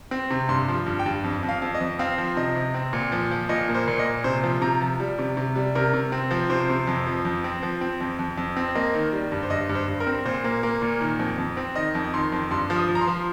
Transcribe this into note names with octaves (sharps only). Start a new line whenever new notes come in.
C4
C3
G2 C6
F3
G2
G5
G2
F2
F2
F5
F2
D#5
F2
C4 F5
F3
C3 D#5
C3
C4
A#2
F3
F3
A#2 D#5
A#3
C5
A#2
D#5
A#2
C3 C5
F3
C3 A#5
F3
G3
C3
C3
G3
C3 A#4
C3
C4
F3
C3 C5
C3
F2
F3
F2
C4
F3
C4
F2
F2
F2
C4
A#3 D#5
D#3
G3
G2
C5
G2 D#5
G2
C5
G2
A#4
C4
A#2 C5
A#3
A#3
A#2
D#3
F2
F2
C4
D#3 D#5
F2
D#3 C6
F2
G2 C6
F3
D#6
F3
A#5
C6
F3